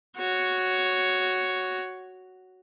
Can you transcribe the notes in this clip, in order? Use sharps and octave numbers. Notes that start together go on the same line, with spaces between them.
F#4 C#5